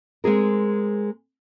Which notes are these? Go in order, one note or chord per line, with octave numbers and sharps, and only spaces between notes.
G#3 C4 G#4 A#4